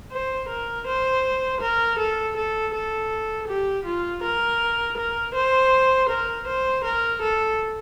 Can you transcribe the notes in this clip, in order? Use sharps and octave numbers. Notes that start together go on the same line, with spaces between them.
C5
A#4
C5
A#4
A4
A4
A4
G4
F4
A#4
A#4
C5
A#4
C5
A#4
A4